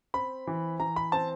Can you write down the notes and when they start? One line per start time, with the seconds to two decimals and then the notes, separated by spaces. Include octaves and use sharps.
0.14 C4 B5
0.47 E3
0.80 E3 A#5
0.96 B5
1.12 C4 A5